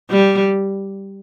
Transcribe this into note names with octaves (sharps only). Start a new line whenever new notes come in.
G3